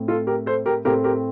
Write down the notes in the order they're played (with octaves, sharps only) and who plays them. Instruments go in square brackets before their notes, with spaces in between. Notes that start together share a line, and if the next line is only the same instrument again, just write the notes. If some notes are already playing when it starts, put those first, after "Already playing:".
Already playing: [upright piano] A2 A3 C4
F4 A4
G4 A#4
A4 C5
G4 A#4
A2 A3 C4 G4 A#4
G4 A#4